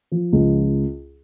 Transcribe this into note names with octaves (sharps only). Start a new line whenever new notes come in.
F3
C#2